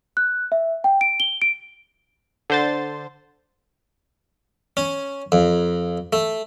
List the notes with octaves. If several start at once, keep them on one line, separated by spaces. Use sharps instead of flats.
F#6
E5
G5
D7
G7
D7
D3 C5 A6
C#4
F2
A3